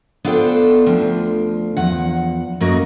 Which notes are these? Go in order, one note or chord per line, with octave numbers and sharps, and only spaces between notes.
B3 D4 F4 A4 C5 G5
D2 F3 D4
E2 F3 F#5
F#2 A#3 F#4 D#5